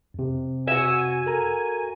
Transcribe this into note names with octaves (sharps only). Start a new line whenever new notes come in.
F2 C3
F#4 E5 G#5
A4 A#4 A#5